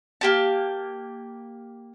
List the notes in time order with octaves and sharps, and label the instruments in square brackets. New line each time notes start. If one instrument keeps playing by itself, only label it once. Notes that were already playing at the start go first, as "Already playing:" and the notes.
[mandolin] A#3 G4 A5